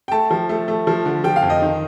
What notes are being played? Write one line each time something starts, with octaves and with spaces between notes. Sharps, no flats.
G5
A3 A5
F3
A3
A3
F3
D3
F3 G5
F5
F2
D#5
D#3